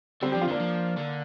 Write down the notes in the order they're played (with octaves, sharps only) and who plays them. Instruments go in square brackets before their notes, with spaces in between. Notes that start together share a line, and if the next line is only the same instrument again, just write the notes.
[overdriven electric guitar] D3 [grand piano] G3 C4
[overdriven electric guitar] F3 [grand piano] D4 G4
[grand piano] C4 F4
[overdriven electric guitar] D3 [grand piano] A#3 D4
[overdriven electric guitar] F3
D3